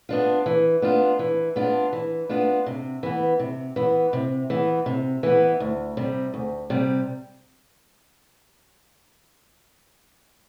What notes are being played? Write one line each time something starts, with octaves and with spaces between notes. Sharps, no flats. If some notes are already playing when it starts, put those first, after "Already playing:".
B3 D4 F4
E3
B3 D4 F4
E3
B3 D4 F4
E3
B3 D4 F4
C3
E3 B3
C3
E3 B3
C3
E3 B3
C3
E3 B3
D2
C3 G3
D2
C3 G3